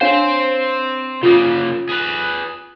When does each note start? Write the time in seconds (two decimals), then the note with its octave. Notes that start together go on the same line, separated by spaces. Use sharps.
0.01 C4 D4 C5 C#5 F5
1.23 C#3 A#3 F4 D#6
1.89 G#4 B4